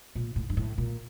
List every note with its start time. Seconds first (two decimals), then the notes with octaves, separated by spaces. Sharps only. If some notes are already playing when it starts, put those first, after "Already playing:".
0.15 A#2
0.36 A2
0.50 G2
0.57 A2
0.78 A#2